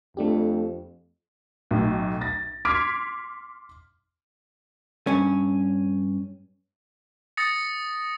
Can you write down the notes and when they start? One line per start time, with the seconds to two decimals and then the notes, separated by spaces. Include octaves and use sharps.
0.17 F2 A3 D4 G4
1.71 B1 A2
2.21 A6 A#6
2.65 C6 D6 F6 G#6 B6 D7
5.07 G2 C#4
7.37 D#6 A6 A#6 C#7